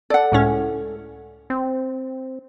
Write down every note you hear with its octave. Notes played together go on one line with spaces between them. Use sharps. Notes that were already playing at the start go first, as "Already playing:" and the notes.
A4 D5 F#5
C#2 A2 C#4
C4